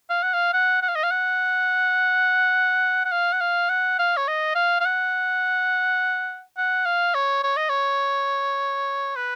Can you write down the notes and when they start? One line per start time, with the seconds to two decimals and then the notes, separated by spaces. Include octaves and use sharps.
0.10 F5
0.23 F#5
0.34 F5
0.53 F#5
0.82 F#5
0.89 F5
0.96 D#5
1.03 F5
1.11 F#5
3.05 F#5
3.12 F5
3.33 F#5
3.41 F5
3.70 F#5
3.99 F5
4.17 C#5
4.28 D#5
4.55 F5
4.81 F5
4.85 F#5
6.58 F#5
6.86 F5
7.15 C#5
7.44 C#5
7.57 D#5
7.69 C#5
9.16 B4